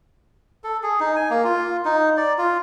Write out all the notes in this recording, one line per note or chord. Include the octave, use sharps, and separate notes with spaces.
A4
G#4
D#4
G#5
A#3
F4
D#4
D5
F4